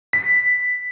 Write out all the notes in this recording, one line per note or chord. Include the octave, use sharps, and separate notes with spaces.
B6